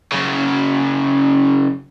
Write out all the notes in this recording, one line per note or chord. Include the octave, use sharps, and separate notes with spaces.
F#2 C#3